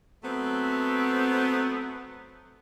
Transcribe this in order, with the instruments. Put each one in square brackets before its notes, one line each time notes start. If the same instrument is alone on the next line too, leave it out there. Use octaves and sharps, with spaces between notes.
[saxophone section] F#3 A3 B3 C4